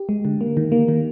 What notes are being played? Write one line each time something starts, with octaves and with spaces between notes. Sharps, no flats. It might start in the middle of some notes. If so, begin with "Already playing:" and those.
Already playing: G4
G#3
D3
A#3
D#3
A#3
D#3